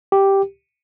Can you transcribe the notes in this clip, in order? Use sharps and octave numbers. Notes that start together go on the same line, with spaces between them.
G4